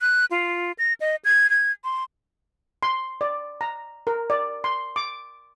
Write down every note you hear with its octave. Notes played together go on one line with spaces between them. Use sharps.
F#6
F4
A#6
D#5
G#6
G#6
C6
C6
D5
A#5
A#4
D5
C6
D6